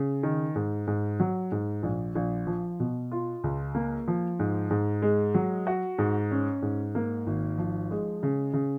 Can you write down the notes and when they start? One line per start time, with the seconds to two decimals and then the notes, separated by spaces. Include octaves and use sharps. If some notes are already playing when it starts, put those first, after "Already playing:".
Already playing: C#3
0.23 D#3
0.55 G#2
0.87 G#2
1.20 F#3
1.52 G#2
1.83 A#1
2.15 A#1
2.47 F3
2.80 B2
3.11 F4
3.44 C#2
3.75 A#3
4.08 F3
4.39 G#2
4.70 G#2
5.02 G#3
5.34 F#3
5.67 F#4
5.98 G#2
6.31 C#4
6.62 G#2
6.95 A#3
7.27 G#1
7.58 F3
7.91 G#3
8.23 C#3
8.54 C#3